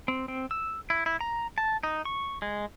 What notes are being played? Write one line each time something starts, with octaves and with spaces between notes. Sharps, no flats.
C4
C4
E6
E4
E4
A#5
A5
D#4
C#6
G#3